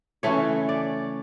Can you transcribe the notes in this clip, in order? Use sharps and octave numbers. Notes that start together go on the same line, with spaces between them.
C#3 E3 A3 C#5
D5